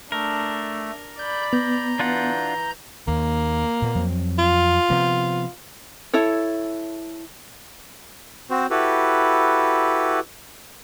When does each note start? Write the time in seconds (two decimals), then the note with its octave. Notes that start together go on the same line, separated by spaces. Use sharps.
0.12 A3 D4 A#4
1.19 D5 B5 G6
1.53 B3 A#5 G6
1.99 E3 D4 F4 F#5
3.08 D#2 A#3
3.82 A#2 B3
3.95 F2 F#3 C4
4.39 F4
4.90 C3 F3 B3
6.13 E4 A4 C#5
8.50 C4 F#4 C5
8.70 E4 F#4 G4 A4 B4